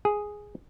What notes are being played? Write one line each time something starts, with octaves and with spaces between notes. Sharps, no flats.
G#4